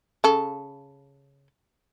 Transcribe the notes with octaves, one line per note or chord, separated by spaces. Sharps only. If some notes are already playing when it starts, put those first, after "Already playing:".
C#3 A4